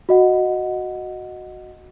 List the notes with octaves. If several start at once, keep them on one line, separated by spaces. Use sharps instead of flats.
F#4 D#5 F#5